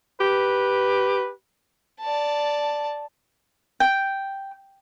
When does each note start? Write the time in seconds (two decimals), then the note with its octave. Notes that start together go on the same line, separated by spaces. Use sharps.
0.21 G4 B4
2.01 D5 A5
3.80 G5